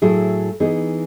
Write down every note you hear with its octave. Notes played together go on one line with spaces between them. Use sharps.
A2 F#3 A3 E4 G#4
E3 B3 D#4 G#4